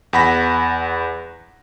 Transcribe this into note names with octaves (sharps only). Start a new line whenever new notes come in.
E2 F#5 B5 A#6